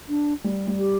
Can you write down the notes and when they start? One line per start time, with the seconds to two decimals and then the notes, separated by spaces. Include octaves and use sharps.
0.09 D4
0.44 G3
0.67 G3
0.79 G4